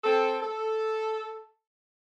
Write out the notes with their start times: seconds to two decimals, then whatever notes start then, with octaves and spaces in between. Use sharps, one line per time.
0.04 C4 A4
0.42 A4